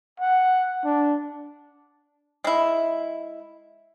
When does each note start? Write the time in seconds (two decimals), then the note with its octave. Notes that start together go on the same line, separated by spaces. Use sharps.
0.20 F#5
0.85 D4
2.44 G#3 E4